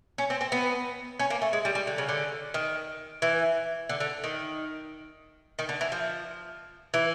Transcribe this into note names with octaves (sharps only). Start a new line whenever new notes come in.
C#4
C4
C4
B3
C#4
A#3
A3
G#3
G3
G3
D3
C#3
D3
D#3
E3
D3
D3
D#3
D#3
D3
E3
F3
E3